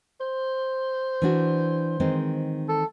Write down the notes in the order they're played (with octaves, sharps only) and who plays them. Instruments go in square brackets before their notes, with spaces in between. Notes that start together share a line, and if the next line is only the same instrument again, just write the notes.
[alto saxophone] C5
[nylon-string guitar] E3 D4 F#4
D#3 G#3 C4
[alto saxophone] A4